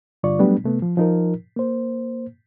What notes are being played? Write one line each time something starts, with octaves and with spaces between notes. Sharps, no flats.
G2 D3 G3 F4 D5 C#6
F#3 G3 A3 B3 D4
C3 A3 B3
F3
F3 D#4 A#4
A#3 C5